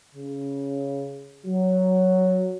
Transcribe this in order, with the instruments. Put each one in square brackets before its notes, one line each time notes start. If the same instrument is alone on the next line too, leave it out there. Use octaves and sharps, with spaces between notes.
[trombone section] C#3
F#3